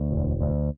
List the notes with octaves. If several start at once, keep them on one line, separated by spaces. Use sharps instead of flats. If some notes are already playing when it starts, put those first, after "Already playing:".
Already playing: D2
E1
D2